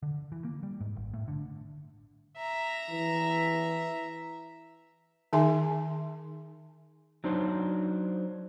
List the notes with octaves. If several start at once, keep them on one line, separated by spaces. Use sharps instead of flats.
D3
E3
A#3
G3
G#2
G#1
A2
D3
E5 A#5
E3
D#3 D#4 G#4 E5 G#5 C6
F#3 D4 D#4 C5